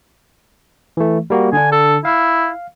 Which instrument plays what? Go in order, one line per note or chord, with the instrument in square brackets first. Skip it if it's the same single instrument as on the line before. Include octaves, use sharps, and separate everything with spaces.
[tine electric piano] E3 A3
G3 A#3 F#4
[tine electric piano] D3 D4 [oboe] G#5
[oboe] A4
[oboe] E4 [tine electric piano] F5